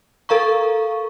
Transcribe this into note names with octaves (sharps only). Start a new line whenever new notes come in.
A4 A#4 F5 A#5 C#6